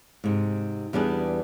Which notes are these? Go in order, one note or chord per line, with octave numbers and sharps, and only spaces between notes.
G#2 C3
E2 G3 B3 D4 G#4